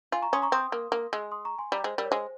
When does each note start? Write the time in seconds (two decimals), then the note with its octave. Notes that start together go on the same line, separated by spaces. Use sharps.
0.12 F4 G#5 C6
0.22 A#5 C#6
0.33 C#4 C6 D#6
0.42 A#5 C#6
0.52 C4 C6 D#6
0.72 A#3
0.92 A#3
1.13 G#3
1.32 C6 D#6
1.45 A#5 C#6
1.59 G#5 C6
1.71 G3 G5 A#5
1.84 G#3 C5
1.98 G3 A#4
2.05 C#5
2.11 G#3 C5